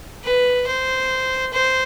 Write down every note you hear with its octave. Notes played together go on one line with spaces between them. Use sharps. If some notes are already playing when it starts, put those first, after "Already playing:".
B4
C5
C5